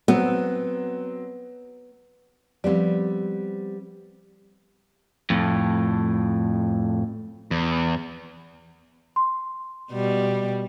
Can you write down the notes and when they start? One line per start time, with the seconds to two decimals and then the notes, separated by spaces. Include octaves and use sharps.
0.08 F#3 B3 C4
2.64 F3 G3 B3 C4 D5
5.30 F2 A2
7.51 E2
9.16 C6
9.91 B2 G3